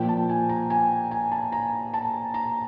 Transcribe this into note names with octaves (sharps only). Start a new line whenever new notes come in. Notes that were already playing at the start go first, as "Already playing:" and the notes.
Already playing: A#2 F3 A#3 G5
A5
G#5
A#5
G#5
G#5
A5
A#5
A5
A#5